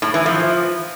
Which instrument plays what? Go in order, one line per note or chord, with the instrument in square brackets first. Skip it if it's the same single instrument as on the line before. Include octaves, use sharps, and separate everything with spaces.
[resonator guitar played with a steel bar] A2
E3
F3